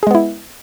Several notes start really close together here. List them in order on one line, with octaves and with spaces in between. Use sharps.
G#4 G#3 B3 E4